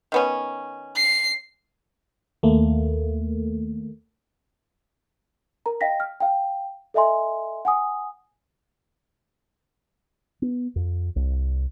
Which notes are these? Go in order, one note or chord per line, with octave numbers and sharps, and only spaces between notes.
D#3 B3 C#4
C7
D#2 A3 A#3
A#4 A#5
D#5 F5 G5 A#6 B6
F6
F5 G5
A4 D#5 E5 G#5 C6
F#5 G#5 D#6
B3
F2
C2